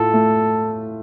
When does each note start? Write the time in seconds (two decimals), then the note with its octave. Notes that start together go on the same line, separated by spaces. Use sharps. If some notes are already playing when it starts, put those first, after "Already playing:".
Already playing: A2 F4 A4
0.13 A3